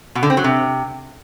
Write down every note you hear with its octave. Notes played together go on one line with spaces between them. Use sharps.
B2
D3
C4
F#3
C3